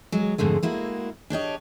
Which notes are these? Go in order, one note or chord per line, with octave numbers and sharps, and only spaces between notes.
F#3 G#3
F2 G#2 D3 G#3 A3
G#3 A#3 E4 F#4
D4 G4 C#5 D#5